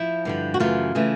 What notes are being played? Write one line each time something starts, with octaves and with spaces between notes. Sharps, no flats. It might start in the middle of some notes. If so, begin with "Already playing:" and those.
Already playing: F3 E4
G2 D3 F3
F#4
F#2 C#3 E3 A3 F4
C#3 E3 A3